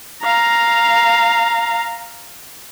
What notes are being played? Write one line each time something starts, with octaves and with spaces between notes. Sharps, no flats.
F5 A#5